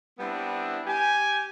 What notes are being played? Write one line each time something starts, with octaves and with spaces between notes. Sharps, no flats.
G3 B3 C4 D4 E4
G4 G#5